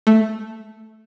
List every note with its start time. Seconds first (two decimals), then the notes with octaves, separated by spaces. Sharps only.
0.07 A3